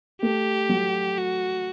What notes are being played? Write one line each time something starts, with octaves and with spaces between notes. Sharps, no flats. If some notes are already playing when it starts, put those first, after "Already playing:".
A3 G4
F#3
F#4